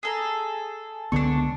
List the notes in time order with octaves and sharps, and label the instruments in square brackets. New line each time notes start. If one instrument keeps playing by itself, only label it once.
[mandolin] G#4 A4 A#5
[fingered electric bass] C#2 D3 B3 [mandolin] D4 C#6